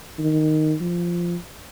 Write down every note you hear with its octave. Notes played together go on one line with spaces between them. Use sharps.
D#3
F3